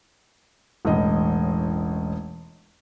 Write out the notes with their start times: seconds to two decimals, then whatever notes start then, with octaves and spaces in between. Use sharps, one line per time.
0.85 E1 A1 D#5